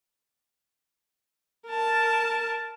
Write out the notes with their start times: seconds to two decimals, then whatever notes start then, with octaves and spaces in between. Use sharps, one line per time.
1.66 A#4 A5